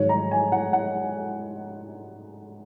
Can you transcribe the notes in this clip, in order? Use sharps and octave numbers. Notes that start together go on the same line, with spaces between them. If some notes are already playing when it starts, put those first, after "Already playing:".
Already playing: G#2 D#3 F#3 C#5
A#5
G#5
F#5
F#5